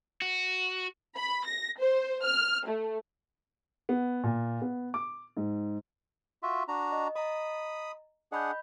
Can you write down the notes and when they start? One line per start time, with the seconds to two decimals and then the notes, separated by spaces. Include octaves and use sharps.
0.22 F#4
1.17 B5
1.46 A#6
1.79 C5
2.24 F6
2.67 A3
3.89 B3
4.24 A#2
4.62 B3
4.94 D6
5.37 G#2
6.43 F4 F#4 E5
6.68 D4 F#4 A#5
6.92 D#5
7.16 D#5 A#5 B5 D#6
8.32 D4 G#4 D#5 F#5 B5 G6